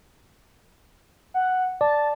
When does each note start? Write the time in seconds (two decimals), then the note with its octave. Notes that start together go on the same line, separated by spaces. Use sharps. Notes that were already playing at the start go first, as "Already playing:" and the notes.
1.34 F#5
1.81 D5 A5